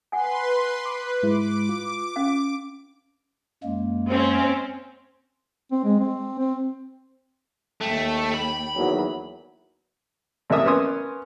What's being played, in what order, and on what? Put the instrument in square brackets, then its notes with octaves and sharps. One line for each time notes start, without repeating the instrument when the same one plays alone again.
[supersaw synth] B4 C6 [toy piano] F#5 G#5
[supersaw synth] B4 [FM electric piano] D6
[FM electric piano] G#2 G#3 E4 [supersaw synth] D6
[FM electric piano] F4
[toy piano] C#4 F5
[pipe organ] F#2 G#3 A#3
[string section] C4 C#4
[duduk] C4
G#3
C4
C4
[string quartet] D#2 G5 [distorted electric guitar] A3
[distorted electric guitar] B5
[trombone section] E2 D#3 F#3
[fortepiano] A1 C3 A#3 E5 D#6
B3 C#4 A#4 C6 D#6